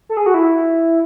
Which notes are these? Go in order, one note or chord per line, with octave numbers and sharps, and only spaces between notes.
A4
G#4
F#4
E4